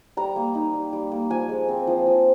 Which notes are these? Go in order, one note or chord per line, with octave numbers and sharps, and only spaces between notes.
G3 A#5
A#3
D#4
G3
G3
A#3
F3 G#5
G#3
C4
F3
F3